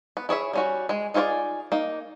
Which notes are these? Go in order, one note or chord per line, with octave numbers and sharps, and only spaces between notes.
B3
E4 G#4 C#5 E5
G3 C#4 F#4
G#3 G#4
D#4 F4 G#4 C#5 D5
A#3 D#4